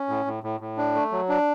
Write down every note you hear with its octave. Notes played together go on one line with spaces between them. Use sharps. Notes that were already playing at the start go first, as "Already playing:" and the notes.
Already playing: C#4
A2
A2
A2
A2
D4
A3
F#3
D4